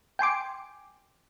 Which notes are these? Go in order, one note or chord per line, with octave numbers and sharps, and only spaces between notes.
G5 G#5 C6 D6